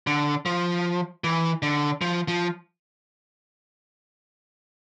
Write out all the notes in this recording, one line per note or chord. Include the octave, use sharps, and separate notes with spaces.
D3
F3
E3
D3
F3
F3